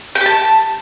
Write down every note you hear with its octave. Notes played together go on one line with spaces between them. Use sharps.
G5
G4
A5